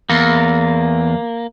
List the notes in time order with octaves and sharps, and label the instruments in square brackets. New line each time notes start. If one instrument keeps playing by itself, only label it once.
[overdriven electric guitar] E2 [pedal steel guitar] A#3